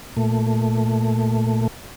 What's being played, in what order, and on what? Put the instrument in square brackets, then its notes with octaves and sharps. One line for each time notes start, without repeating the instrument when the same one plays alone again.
[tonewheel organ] A#2 A3